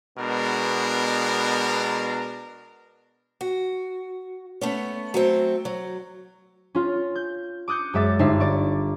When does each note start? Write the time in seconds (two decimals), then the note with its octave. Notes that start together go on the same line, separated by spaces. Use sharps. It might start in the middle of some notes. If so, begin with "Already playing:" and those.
0.18 B2 G#3 B3 D4 A#4
3.41 F#4
4.61 A3 B3 C#4
5.14 F#3 A3 C4
5.65 F#3
6.75 C#4 F4
7.15 G6
7.68 D6 D#6 F#6 G6 C#7
7.94 F#2 G#3 E5 D6 A6
8.19 G1 D#4 E5 C7
8.40 D5 C#6